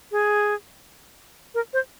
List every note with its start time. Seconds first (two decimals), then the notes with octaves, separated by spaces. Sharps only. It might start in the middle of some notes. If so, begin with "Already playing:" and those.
0.12 G#4
1.55 A#4
1.73 C5